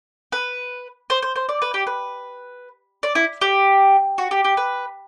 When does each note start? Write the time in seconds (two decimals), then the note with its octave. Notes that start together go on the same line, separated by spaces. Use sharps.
0.32 B4
1.10 C5
1.22 C5
1.36 C5
1.49 D5
1.62 B4
1.74 G4
1.87 B4
3.03 D5
3.15 E4
3.42 G4
4.18 F#4
4.31 G4
4.44 G4
4.57 B4